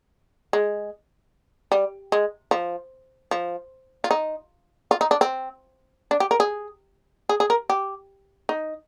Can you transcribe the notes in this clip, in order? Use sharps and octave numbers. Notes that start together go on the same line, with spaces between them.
G#3
G3
G#3
F3
F3
F4
D#4
F4
D#4
D4
C4
D4
G4
A#4
G#4
G#4
G#4
A#4
G4
D#4